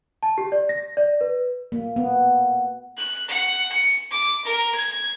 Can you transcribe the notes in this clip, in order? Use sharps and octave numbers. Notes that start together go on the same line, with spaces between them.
A5
G4
D5
A#6
D5
B4
A#3
B3
F#6
F#5
C#7
D6
A#4
G#6